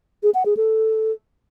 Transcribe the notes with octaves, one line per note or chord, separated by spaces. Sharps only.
G#4
F#5
G#4
A4